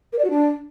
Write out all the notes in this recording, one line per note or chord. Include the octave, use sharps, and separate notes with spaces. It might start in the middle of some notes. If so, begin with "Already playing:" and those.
A#4
D5
F#4
D4